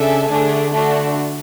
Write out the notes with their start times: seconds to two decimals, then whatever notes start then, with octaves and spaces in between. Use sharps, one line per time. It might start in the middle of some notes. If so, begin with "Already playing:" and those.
Already playing: C#3 D4 A4 E5 G#5
0.29 D3 A3 D4 G#4
0.72 A3 D4 F#4